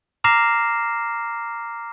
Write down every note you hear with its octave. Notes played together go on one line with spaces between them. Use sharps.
A#5 D6 F6 A#6 C7 E7